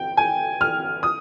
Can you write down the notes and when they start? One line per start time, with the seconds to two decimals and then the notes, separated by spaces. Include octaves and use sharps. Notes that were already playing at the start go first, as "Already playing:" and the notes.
Already playing: G5
0.17 G#5
0.61 F6
1.03 D#6